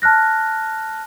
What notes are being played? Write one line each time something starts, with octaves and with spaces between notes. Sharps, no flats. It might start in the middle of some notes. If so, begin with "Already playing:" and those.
A5 F6 F#6 A#6